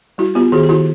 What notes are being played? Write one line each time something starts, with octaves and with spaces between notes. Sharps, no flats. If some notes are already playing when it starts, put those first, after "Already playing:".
G3 E4 F#4
B3 F4 G4
D#3 F#4 G#4
G4
D#3 E4 F#4